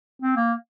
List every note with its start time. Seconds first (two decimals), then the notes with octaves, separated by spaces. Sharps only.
0.22 C4
0.37 A#3